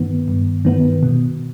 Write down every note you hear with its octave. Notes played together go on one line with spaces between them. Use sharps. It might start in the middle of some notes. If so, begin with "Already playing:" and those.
Already playing: G2 D#3 B3
G2
D#3 B3
B2